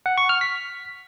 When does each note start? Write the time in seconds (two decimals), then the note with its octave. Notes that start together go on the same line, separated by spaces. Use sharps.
0.06 F#5
0.18 C#6
0.29 F6
0.41 B6